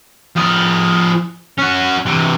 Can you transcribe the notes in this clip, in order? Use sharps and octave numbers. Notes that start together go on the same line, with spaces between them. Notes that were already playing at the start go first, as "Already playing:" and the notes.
F3 G#4
C#4 F#4
C3 E3